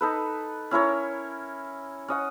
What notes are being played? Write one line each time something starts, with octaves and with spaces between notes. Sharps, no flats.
D#4 A4 B4
C#4 E4 A#4 C#5
C#4 D#5 F#5